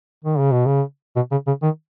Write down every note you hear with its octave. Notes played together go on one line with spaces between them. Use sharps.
D#3
C#3
B2
C#3
B2
C#3
C#3
D#3